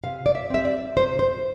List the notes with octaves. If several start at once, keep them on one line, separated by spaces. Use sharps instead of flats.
C3 F5
D5
E5
G3 C4 E5
D5
C3 C5
C5